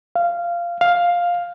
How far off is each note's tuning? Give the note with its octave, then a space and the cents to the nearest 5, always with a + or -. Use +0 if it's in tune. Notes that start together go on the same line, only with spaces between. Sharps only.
F5 -15
F5 +5